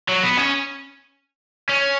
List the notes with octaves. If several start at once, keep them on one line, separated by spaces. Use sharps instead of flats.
F#3
B3
C#4
C#4